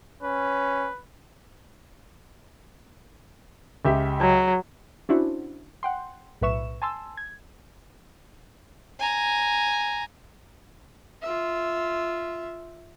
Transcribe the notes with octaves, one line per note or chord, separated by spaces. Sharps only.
C#4 B4
C#2 G4 E5
F#3
C#4 D4 E4 F#4 C5
F#5 G5 C6
B1 A2 B4 E5 C#6 E7
G#5 A5 C6 E6
G#6
G#5 A#5
F4 E5